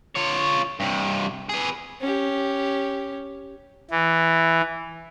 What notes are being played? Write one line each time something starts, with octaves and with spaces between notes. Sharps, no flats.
F4 C#5
G2 C3
G#4 B4
C#4 G4
E3